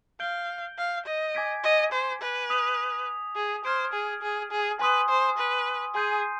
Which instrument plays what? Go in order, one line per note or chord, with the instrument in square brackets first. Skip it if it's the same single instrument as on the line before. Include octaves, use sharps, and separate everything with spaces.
[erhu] F5 [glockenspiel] G6 D7 G7
[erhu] F5
D#5
[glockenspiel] G#5 D6 G#6 B6 D7
[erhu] D#5
C5
B4
[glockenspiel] D#6 B6 F7
[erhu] G#4
[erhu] C5 [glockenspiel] F6 G#6 D7
[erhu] G#4
G#4
G#4
[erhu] B4 [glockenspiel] G#5 C6 D#6
[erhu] C5
B4
[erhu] G#4 [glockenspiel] G#5 C6 G6 C7 D#7